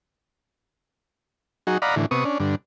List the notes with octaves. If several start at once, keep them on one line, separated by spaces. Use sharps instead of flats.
F#3 D#4 F#4 G#4
D5 D#5 F5 F#5 A#5 B5
A2 D3 E3
C3 B3 C#6 D#6
C#4 D4
G2 D3